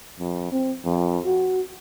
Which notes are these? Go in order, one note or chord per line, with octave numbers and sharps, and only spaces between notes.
F2
C4
F2
F#4